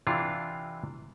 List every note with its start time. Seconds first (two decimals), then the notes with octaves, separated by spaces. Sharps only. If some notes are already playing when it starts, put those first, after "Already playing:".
0.07 C3 E3 D4 F4